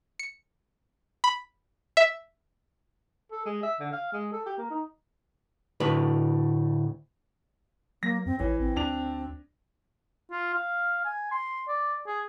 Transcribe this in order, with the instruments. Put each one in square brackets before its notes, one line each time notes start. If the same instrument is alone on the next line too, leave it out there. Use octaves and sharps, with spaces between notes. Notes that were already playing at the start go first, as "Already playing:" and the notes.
[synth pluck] C#7
B5
E5
[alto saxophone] A4
G#3
E5
D3
F5
G#3
A4
G4
A#3
D#4
[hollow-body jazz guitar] D2 A2 B4
[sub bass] F#3 [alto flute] A#3 [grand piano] A#6
[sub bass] F2 [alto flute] C4
[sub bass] A1 [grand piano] E3 [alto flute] C#5
[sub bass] A1 [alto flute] C4
[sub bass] D2 [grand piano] D4 F7
[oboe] F4
F5
G#5
C6
D5
G#4